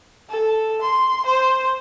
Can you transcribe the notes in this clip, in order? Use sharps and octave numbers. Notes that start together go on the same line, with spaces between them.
A4
C6
C5